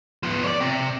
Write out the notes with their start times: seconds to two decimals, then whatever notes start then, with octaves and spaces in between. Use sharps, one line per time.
0.23 F3 B3
0.44 C#5 D5
0.61 C3